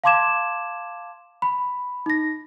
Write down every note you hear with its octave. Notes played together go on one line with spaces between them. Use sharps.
F5 A5 C6 D6 G#6 E7
B5
D#4 A#6